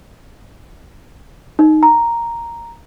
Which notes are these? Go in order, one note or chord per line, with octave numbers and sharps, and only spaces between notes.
D#4
A#5